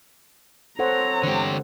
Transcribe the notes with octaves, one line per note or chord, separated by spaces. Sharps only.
C4 A4 C5 C#5 F#5 A#5
D3 E3 G#3 G4